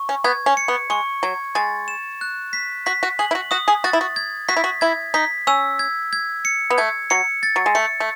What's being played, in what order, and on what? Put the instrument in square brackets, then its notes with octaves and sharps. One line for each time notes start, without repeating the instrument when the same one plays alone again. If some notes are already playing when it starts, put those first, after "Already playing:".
Already playing: [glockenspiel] C#6
[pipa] C#4
[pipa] B3 [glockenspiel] G#6
[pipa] C#4
[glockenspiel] C#7
[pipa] B3
[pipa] G#3 [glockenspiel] C#6
[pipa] F#3 [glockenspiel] G#6
[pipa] G#3 [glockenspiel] A6
[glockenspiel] E7
F#6
B6
[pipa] F#4 [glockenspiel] B6
[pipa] F#4
[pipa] G#4 [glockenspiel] F#7
[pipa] E4
F#4
[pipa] F#4 [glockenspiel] D#6
[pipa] G#4
[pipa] F#4 [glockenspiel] A6
[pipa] E4
F#4
[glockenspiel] G#6
[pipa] F#4 [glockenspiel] B6
[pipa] E4
F#4
[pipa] E4 [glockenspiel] G#6
[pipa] D#4 [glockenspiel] B6
[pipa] C#4 [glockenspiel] E6
[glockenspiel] G#6
G#6
C#7
[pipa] B3
[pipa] A3 [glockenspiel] G#6
[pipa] F#3 [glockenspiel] C#7
[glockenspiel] A6
[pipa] F#3
G#3
[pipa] A3 [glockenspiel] C#7
[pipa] A3